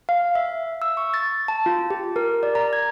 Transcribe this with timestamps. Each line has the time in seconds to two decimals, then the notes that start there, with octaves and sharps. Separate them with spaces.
0.09 F5
0.35 E5
0.82 E6
0.97 C#6
1.14 A6
1.48 A5
1.66 F4
1.90 G4
2.16 A#4
2.43 D5
2.55 A#5
2.73 G#6